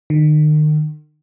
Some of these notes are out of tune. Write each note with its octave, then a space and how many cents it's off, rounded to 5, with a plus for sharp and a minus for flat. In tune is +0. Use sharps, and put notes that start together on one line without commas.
D#3 -40